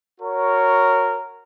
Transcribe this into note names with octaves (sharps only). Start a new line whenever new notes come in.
F#4 A#4 C#5